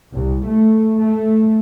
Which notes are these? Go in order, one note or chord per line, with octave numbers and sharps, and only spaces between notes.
C2
A3
A3